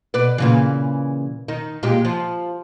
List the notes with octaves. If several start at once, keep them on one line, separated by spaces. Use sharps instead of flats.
B2 B4 D5
A#2 C#3 E3
D#3 D#4
A#2 G#3 G4
F3